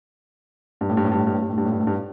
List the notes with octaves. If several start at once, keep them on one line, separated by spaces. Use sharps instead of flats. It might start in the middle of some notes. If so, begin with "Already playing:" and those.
G2
A2
G2
A2
G2
A2
G2
A2
G2
A2
G2
A2
G2
A2
G2